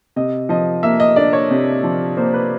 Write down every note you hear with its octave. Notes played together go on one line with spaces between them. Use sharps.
C3 D#5
F3 D#5
A#3 E5
D#5
D4 D5
C#5
C3
F3
A#3 C5
B4